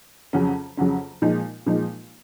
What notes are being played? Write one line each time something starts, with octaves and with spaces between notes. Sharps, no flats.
F2 C#3 F#3 C#4
F2 C#3 F#3 C#4
A#2 F3 G#3 D#4
A#2 F3 G#3 D#4